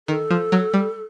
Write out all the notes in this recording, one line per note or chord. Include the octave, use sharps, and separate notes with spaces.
D#3 A4
F3
F#3
G3